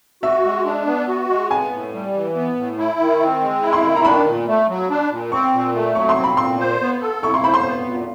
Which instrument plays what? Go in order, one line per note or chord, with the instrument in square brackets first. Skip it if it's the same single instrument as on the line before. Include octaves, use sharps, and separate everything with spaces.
[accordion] F#4 [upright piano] E5
[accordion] G#3
D4
B3
F#4
G#3
[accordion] B3 [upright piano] G#5
[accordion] A2
G3
E3
B3
A2
E4
D#3
C4
G#3
E4
[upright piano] C6
[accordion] D#3
[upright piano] A#5
[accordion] D4 [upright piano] B5
[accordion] A#2
A3
F#3
D4
A#2
[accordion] C4 [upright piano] C#6
[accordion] A#2
A3
[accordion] F#3 [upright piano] C#6
[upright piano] C6
[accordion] C4
[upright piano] B5
[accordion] A#2 [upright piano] C6
[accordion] C5
B3
A4
[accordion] E4 [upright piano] C#6
[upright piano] C6
[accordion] C5 [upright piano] B5
[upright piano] C6
[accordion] B3
A#2